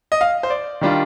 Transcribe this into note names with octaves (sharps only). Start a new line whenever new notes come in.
D#5
F5
C5
D5
D#3 G3 D4 F4